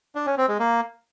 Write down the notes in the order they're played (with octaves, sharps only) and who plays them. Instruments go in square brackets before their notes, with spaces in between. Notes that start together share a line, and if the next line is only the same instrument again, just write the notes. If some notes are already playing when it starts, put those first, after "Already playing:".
[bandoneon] D4
C#4
C4
G#3
A#3